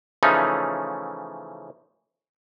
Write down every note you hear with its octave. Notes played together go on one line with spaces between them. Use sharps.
C#3 E3 F3 A3 C#4 D#4